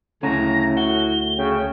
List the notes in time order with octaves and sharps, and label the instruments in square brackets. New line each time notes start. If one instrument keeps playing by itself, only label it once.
[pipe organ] D2 A3 [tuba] A2 [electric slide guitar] C#3 C#4 F#5 [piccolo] A#5
[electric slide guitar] F#4 F#5 [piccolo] G7
[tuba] C#3 [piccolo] G5